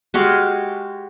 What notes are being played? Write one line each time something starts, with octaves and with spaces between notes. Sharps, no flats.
G#3 F#4 G4 F5